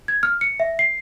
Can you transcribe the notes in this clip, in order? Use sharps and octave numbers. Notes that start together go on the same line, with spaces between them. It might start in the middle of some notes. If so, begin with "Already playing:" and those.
G#6
F6
C#7
E5
C7